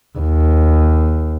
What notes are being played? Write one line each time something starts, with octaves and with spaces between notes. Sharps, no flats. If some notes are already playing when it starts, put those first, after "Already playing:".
D#2